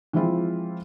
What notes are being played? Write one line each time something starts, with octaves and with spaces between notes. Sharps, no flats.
E3 F3 G#3 C4 E4 F4